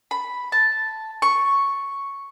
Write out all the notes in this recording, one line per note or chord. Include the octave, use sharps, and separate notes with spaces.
B5
A5
C#6